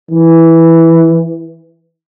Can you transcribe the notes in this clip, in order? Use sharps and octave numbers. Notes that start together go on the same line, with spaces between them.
E3